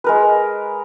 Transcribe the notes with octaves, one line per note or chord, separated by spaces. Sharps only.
G#3 A#4 B4